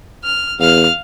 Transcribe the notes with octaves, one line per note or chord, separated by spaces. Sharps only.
F6
E2 F5 F6